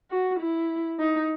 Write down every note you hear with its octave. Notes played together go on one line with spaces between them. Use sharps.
F#4
E4
D#4